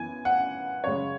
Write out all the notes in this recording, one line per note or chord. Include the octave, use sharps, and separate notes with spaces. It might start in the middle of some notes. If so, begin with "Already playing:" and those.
Already playing: F#2 E3 B3 G#5
F#5
F#2 C#3 G#3 C#5